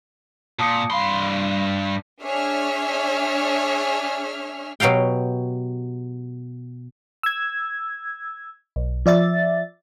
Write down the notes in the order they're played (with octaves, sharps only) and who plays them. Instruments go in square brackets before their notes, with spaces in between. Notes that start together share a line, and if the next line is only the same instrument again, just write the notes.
[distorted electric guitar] A#2 [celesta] A5 D#6 C#7
[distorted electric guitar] G2 C6 [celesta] F5 B5
[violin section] D4 G#4 C#5 E5 F6
[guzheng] B2 F#3 G4 F5 G5
[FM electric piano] E6 G#6
B1
F3 D5 E5 A6